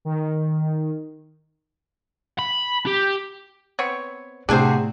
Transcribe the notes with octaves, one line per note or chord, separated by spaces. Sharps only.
D#3
B5
G4
B3 C4 C#5
A2 C3 D4 F#4 G#4 C5